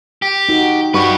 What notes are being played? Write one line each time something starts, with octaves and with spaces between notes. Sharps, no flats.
G4
D#4 F#4
G2 F#4 G4 B4 C#6